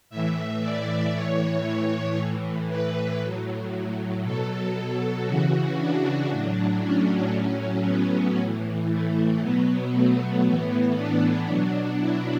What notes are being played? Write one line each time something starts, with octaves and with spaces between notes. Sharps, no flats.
A2 E3 E5
D5
A2 E3 C#5
A2 E3
B4
A2 F#3
B2 F#3 A4
A4
C#3 E3 F#4
D4
A2 F#3 D4
C#4
A2 F#3 C#4
B3
A2 E3
A3
B2 F#3 B3
A3
A2 E3 B3
D4
B2 F#3 D4
E4